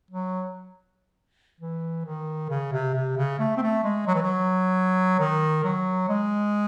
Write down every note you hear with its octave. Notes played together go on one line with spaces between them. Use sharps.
F#3
E3
D#3
C#3
C3
C3
C#3
A3
C4
A3
G#3
F#3
E3
F#3
D#3
F#3
G#3